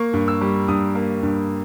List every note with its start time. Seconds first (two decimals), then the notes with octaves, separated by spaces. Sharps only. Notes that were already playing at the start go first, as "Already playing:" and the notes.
Already playing: A#3 C#6
0.13 G2
0.28 E6
0.41 G3
0.68 G2 D#6
0.95 A#3
1.23 G2